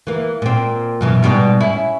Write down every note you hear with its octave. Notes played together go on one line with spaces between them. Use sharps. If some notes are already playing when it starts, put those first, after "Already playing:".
E3 A#3
A#2 C4
F#2 B2 E3
G#2 B2 G3
C#4 E4